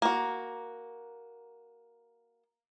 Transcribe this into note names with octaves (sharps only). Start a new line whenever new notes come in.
A#3 F#4